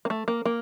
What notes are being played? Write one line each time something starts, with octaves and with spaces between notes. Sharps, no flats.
A#3
A3
A#3
A#3